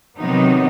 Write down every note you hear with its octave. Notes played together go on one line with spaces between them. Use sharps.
C3 D#3 F#3 B3 D#4